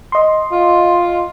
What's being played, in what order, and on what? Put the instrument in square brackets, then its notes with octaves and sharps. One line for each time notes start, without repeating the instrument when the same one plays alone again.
[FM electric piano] D#5 C6
[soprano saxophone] F4